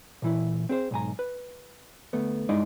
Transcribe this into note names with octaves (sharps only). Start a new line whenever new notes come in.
A#2 E3 E4
C4 G#4 C5
B1 G#2 G#5 A#5
B4
D2 A3 B3
G2 G#3 D#4 E4 D5 D#5